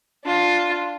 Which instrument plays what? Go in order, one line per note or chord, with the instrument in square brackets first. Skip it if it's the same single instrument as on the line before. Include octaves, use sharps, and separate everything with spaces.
[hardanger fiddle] D4 F4